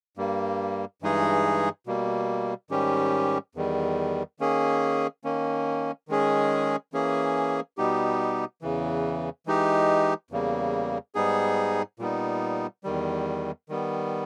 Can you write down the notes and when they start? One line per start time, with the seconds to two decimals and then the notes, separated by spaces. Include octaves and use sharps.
0.17 G2 G3 A#3
1.02 G2 E3 G#3 D#4 G#4
1.87 B2 G3 A#3
2.70 G#2 D#3 G3 C#4 G4
3.55 E2 D#3 G3
4.40 D#3 A#3 C#4 G#4
5.24 D#3 A#3 C#4
6.08 D#3 G#3 C#4 G#4
6.93 E3 A#3 C#4 G#4
7.77 B2 G3 B3 D#4 G4
8.62 E2 C#3 E3
9.46 E3 G#3 D#4 G4
10.31 E2 C#3 G3 A#3
11.15 G#2 G3 B3 D#4 G#4
11.99 A#2 G3 B3 D#4
12.84 E2 D#3 G3
13.69 D#3 G3 B3